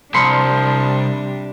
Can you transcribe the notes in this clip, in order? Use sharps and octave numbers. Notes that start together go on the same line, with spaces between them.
C2 C3 F3 G3 D4 B5 C6 C#7